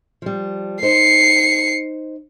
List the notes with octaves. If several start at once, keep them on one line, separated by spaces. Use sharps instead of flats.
F3 G3
D#4 C5 C7 C#7